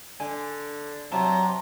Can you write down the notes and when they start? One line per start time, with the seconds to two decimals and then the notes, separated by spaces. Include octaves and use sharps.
0.20 D3 G#5
1.12 C3 F#3 C#5 A5 A#5